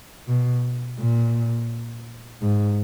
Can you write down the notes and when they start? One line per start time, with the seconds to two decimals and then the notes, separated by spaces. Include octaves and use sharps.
0.28 B2
0.99 A#2
2.42 G#2